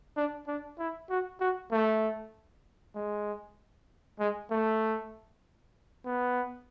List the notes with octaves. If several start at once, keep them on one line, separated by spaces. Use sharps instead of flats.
D4
D4
E4
F#4
F#4
A3
G#3
G#3
A3
B3